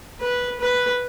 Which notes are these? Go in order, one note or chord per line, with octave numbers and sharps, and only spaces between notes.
B4
B4